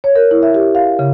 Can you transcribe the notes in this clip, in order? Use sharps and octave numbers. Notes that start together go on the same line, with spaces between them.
C#5
A#4
E4
E5
G4
F5
C#3